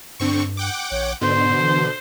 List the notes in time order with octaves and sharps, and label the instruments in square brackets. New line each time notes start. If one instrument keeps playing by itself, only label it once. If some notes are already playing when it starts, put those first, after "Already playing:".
[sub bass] G2 [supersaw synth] D3 C4 C#6
[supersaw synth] F#5 G5 D6
[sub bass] A#1 [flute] C#5
[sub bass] G#2 [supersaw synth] B2 D3 [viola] C5 [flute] C6
[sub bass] E3